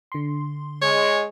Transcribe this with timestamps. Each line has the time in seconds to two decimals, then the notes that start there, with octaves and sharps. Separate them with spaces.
0.12 D3 C6
0.82 G#3 C#5